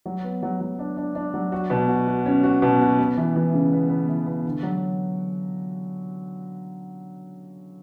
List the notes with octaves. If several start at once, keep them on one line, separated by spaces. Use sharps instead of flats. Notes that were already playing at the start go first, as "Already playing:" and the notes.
F#3
B3
F#3
F#3
D4
D4
D4
F#3
F#4
B2
F#4
F#4
C#4
F#4
B2
F#4
B3
E3
E3
C#3
B3
B3
E3
B3
D3
F#3